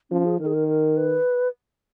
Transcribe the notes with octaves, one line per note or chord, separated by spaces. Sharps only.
F3 C#4
G#4
D#3 A#4
G#4
A#4
A#4
B4